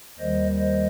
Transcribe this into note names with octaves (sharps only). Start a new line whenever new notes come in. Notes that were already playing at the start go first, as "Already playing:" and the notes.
D#2 D#3 G3 C5 D#5
C5 D#5